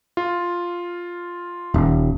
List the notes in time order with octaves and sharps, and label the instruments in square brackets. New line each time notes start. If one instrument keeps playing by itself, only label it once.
[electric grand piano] F4
[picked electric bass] D#1